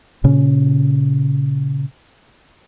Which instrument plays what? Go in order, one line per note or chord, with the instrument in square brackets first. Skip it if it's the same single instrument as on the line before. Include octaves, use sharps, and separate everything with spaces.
[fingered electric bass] A#2 C#3 C#4